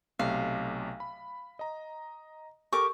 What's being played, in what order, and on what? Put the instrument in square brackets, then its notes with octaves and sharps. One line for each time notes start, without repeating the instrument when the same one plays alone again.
[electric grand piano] B1 C3 A3 [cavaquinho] F5
[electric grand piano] B5
D#5 A#5
[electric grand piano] G4 A4 A#4 [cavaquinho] C#6 D6